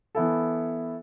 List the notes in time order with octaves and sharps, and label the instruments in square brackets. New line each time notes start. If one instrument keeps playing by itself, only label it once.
[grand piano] E3 B3 E4 A4